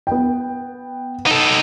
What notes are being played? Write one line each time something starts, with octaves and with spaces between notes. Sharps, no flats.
B3 G5
D#4 A4